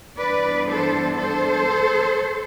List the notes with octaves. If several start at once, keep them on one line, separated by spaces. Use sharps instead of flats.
G2 E3 B3 D4 B4 D5
A4 C5
A4 C5